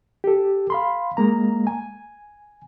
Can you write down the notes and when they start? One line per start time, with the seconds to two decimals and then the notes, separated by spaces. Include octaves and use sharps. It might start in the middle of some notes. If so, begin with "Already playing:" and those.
0.24 G4 A4
0.70 F5 B5 C6
1.17 G#3 A#3 A#5
1.67 G#5